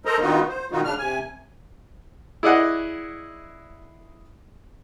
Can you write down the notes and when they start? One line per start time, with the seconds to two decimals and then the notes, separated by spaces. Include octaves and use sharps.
0.05 A4 A#4 C5 D#5 A#5
0.20 D3 D#3 B3 D#4 F4 F#4
0.48 C5
0.71 B2 D#3 D#4 F4 F#4
0.84 C#3 D4 F6
0.98 C3 G#5
2.43 E4 G#4 D5 D#5 F#5